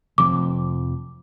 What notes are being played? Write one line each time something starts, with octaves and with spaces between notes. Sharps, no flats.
F1 F2 D6